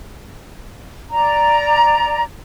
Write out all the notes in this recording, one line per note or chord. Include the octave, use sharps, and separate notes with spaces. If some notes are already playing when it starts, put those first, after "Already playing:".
D5 A#5